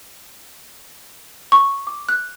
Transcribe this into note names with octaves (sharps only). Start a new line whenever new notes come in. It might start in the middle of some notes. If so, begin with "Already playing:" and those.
C#6
D6
F#6